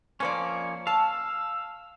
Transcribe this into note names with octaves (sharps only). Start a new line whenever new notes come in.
F2 F3 A#3 C#4 C5 D5 C#6
F5 A5 E6